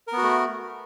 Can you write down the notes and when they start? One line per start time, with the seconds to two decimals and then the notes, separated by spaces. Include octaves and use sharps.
0.08 A#4
0.12 B3
0.17 F#4
0.22 A3